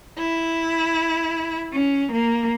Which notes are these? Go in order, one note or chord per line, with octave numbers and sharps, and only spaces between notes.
E4
C#4
A#3